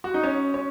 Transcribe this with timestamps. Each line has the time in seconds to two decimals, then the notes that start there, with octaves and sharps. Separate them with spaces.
0.04 F#4
0.14 D#4
0.23 C#4
0.54 C#4